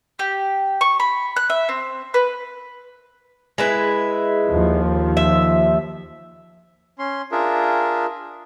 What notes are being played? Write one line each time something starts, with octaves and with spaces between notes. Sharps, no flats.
G4
C#6
B5
F#6
E5
C4
B4
G#3 E4 B4
D#2 F3
E5
C#4 C6
D4 F4 G#4 A#4 E5